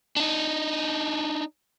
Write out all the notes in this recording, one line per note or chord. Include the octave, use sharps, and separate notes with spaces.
D4 D#4